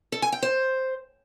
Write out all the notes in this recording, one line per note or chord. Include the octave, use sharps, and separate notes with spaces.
A4
G#5
G5
C5